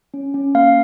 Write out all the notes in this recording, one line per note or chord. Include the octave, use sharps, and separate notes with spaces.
C#4
C#4
A#3 F5